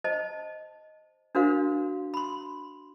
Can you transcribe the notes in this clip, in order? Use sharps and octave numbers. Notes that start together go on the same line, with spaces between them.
C5 D#5 A5
D4 F#4 A#4 C5 F5
B5 C6